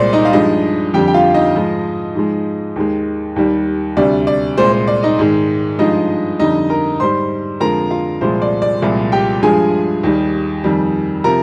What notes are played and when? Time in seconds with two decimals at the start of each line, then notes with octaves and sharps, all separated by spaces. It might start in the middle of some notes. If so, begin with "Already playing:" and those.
Already playing: C2 A#2 G#3 C5 D5
0.13 D#4 D#5
0.25 F5
0.33 G2 F3 G#3 D#4 D#5
0.94 F2 D3 G3 G4 G5
1.08 G5
1.14 F4 F5
1.34 D#4 D#5
1.55 G#2 F3 G#3
2.15 G#2 F3 G#3
2.76 D#2 D#3 G#3
3.36 D#2 D#3 G3
3.97 D2 C3 G3 D5
4.27 D5
4.58 C2 A#2 G#3 C5
4.73 C5
4.87 D5
5.03 D#4 D#5
5.19 G#2 D#3 G#3
5.79 G2 F3 G#3 D#4 D#5
6.40 F2 D3 G3 D#4 D#5
6.70 A#4 A#5
7.00 G#2 G3 C5 C6
7.60 F2 D3 F3 G#3 A#4 A#5
7.91 F4 F5
8.21 C2 A#2 F3 G#3 C5
8.42 D5
8.62 D5
8.82 C2 A#2 F3 G#3
9.12 G4 G5
9.42 G2 F3 G#3 G#4 G#5
10.03 D#2 D#3 G3
10.64 F2 D#3 G3
11.24 C3 F3 A#4 A#5